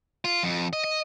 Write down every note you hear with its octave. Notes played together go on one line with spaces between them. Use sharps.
F4
F2
D#5
D#5